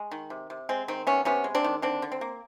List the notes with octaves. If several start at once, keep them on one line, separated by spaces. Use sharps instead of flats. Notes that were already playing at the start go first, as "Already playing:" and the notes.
Already playing: G#3
D#3
C3
C3
G#3 C4
D#3 C4
C3 B3 C#4
C3 B3 C#4
G#3
C4 D4
D#3
D3 C4 D4
D3
C4
A#3